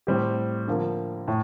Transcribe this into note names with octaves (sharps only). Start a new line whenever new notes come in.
A2 G3 C4 G4
D3 F3 A#3
A2